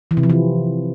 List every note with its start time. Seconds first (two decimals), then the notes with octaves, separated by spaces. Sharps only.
0.11 E3
0.17 C3
0.23 F3
0.30 E3